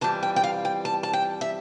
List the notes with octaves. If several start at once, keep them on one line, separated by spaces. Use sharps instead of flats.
F2 E3 G3 A5
G5
G5
F5
G5
A5
A5
G5
E5